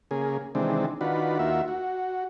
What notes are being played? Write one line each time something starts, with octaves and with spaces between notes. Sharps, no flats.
C#3 A#3 G#4
C3 D#3 E3 G#3 C4 D4
D#3 D4 F4 F#4 B4
D#2 A#3 F4 F#4 E5
F#4